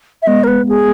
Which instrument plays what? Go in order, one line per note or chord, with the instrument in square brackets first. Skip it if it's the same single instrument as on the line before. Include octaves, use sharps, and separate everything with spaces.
[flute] E5
[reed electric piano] G#3 B3 [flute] D#5
[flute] A#4
B4
G#4